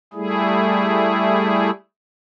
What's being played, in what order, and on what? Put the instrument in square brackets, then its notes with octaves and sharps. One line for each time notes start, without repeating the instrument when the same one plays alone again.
[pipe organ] G3 A3 E4 G#4